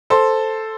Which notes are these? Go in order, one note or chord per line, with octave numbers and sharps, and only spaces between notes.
A4 C5